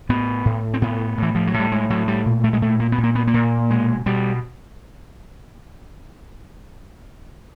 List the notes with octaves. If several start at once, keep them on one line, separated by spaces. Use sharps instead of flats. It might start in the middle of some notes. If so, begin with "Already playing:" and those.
A2 B3
A2
C4
A2 B3
A2 E3
F3
F#3
A2
G3
G#3
A2 F#3
G3
A#2
A3
G#3
A#2 A3
A#3
B3
A#2
A#3
B3
A#3
A#2
B2 G#3
B2 G3